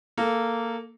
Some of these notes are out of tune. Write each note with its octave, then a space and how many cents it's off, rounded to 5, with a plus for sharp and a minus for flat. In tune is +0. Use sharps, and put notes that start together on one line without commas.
A#3 -10 A4 +0